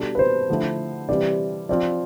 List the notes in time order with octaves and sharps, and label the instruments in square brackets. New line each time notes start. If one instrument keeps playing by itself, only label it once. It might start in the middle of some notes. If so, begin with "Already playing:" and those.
Already playing: [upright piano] B2 G3 D4 A4
[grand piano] B4
C5
[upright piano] D3 F3 A3 E4
[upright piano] C3 E3 G3 C4 [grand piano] D5
[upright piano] F3 C4 F4 [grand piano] D5